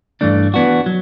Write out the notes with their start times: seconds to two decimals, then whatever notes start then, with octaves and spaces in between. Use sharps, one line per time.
0.21 G2 E3 A3 D4
0.54 E3 B3 D4 F#4
0.86 F#3